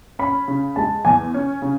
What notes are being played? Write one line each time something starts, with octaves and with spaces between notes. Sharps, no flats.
C#4 B5
C#3
G#3 A5
E2 G#5
C#4
C#3